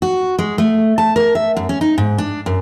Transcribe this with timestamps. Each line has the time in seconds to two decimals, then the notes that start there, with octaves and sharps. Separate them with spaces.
0.02 F#4
0.39 G#3
0.58 A3
0.98 A5
1.16 A#4
1.35 E5
1.57 F#2
1.69 C#4
1.81 D#4
1.98 G#2
2.18 D4
2.46 F#2